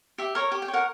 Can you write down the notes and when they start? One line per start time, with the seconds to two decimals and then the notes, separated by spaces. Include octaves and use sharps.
0.18 G4 E5
0.35 A#4 C#5
0.52 G4
0.62 G5
0.68 C#5
0.73 A#4 F#5